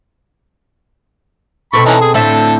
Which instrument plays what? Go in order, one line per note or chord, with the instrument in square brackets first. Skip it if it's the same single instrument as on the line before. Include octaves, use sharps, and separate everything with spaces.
[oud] B2 C4 A4 [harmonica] B5 C#6
[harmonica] E3 C#4 D#4
G#4
[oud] A2 C4 E5 [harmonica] D3 A4